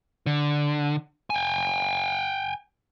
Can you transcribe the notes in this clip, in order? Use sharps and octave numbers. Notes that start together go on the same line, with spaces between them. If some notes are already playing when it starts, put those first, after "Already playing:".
D3
G5 G#5